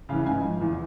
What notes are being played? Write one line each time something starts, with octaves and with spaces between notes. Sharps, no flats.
C#3 E3 F5
G#2 G#5
F3
E2